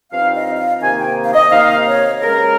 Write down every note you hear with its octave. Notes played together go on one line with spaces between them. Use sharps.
G2 F3 C4 D#4 F5
D#5
F5
C3 D#3 A#3 D#4 G#5
G5
F5
D#5
C3 D#3 A#3 D#4 F5
C#5
C#2 C#3 G#3 C#4 A#4